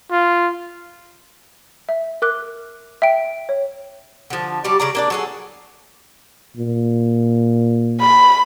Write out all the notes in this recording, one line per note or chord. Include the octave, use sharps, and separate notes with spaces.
F4
E5
A#4 D6 F#6
E5 G5 D7
C#5
D3 F3
F#3 G3 G4 D5
C#3 D5 A#5
A#3 D4 D5
F#3 G#4 A4
A#2
B5